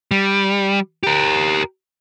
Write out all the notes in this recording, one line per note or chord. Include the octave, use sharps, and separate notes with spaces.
G3
G4 A#4